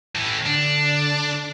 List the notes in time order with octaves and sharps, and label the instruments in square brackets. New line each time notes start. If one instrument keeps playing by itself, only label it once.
[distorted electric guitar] A2 E3
[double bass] D3 [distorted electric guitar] D4